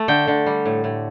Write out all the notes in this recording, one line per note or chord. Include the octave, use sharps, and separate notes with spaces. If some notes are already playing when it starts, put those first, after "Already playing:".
Already playing: A3
D3 G5
D3
G3
A2
A2